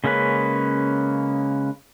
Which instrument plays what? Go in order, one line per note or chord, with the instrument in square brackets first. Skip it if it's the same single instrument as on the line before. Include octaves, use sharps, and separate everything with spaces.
[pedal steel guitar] C#3 G#3 A#3 C#4 B4